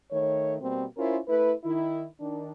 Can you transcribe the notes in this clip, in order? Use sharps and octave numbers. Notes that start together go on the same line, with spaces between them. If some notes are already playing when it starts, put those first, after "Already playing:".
D#3 A3 C#5
B2 G3 A#3 C4
C#4 E4 F4 A#4 C5
A3 E4 B4
D#3 E4
D#3 D4